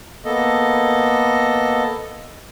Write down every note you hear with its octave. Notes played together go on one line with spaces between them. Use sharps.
A#3 B3 A4 D#5